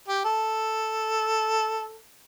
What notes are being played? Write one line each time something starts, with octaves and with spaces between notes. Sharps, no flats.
G4
A4